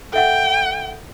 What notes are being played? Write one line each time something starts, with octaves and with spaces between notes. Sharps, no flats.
A4 E5 F#5 G5